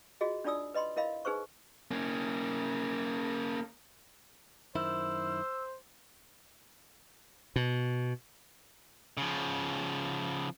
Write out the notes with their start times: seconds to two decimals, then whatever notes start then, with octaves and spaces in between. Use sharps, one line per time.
0.21 F4 F#4 G#4 D#5
0.44 D4 D#4 F4 D5 D#6 E6
0.74 B4 D#5 B5 C6
0.96 E4 A#4 D#5 F5 B5
1.25 D#4 G#4 B4 C5 C#6
1.91 A#3 C#4
4.75 F#2 D#3 E4 C5 E6
7.56 B2
9.17 C#3 F3